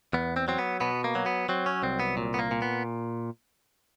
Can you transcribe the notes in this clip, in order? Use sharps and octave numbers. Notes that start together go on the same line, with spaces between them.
E2 B3
C4
F#3 C4
B3
B2 B3
A#3
F#3
B3
F#3 C4
C#4
C2 C4
B3
A#2
B3
A#3
A#2
B3